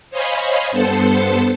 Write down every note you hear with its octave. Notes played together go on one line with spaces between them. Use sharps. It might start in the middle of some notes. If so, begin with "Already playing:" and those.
C5 C#5 D#5 F5 G#5 B5
G2 B3 A4 C5 A5 C#7